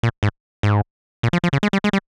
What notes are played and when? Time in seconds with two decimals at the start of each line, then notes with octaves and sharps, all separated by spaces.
0.03 A#2
0.23 G#2
0.63 G#2
1.23 A#2
1.33 F3
1.44 F3
1.53 C#3
1.63 G#3
1.73 G3
1.84 G#3
1.93 G3